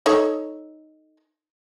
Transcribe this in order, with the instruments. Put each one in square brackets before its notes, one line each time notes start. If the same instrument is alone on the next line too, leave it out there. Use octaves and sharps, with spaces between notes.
[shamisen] D#4 A4 C#5